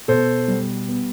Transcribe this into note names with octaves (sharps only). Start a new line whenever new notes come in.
B2 A4 C5
G3
B3